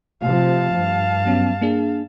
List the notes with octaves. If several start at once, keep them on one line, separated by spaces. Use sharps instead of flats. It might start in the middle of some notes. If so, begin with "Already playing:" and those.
C3 F3 A3 F5 A5
G2
F#3 B3 C#4
A#3 D4 G#4